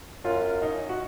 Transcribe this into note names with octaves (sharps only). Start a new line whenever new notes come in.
F#2 F4
D#4
F#4